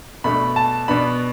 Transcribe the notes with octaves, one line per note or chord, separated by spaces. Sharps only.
B2 A3 D4 B5
A5
B2 B3 D4 B5